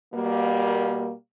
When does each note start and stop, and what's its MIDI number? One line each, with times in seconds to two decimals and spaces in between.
0.13 1.11 47
0.13 1.11 55
0.13 1.11 58